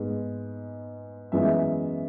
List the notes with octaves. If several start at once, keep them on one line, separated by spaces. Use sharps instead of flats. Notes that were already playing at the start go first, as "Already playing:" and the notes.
Already playing: G#2 G#3 B3
F#2 E3 G#3 B3 E5